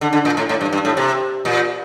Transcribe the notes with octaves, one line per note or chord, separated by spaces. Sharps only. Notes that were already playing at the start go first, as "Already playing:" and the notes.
D3
D3
A#2
A2
A2
G2
G2
A2
C3
A#2